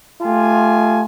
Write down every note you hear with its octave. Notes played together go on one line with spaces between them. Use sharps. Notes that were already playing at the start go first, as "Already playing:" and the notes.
A3 F4 G4 G#5